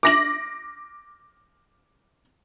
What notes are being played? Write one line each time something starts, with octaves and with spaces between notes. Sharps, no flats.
D6 A#6 F#7